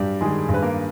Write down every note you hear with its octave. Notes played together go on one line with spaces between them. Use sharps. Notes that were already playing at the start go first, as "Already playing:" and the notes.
Already playing: G2 F#3 G3 G4
D#3 G#3 G#4
G2
B4
A#3 A#4